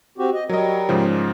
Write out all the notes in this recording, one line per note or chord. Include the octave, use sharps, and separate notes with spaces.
C4 F#4 G4
D#5
F#3 G3 A#4 D#5
G#2 C#3 F3